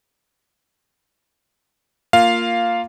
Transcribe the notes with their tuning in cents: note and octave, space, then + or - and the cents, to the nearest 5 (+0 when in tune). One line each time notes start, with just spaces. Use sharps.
A#3 -10 F4 +0 F5 +0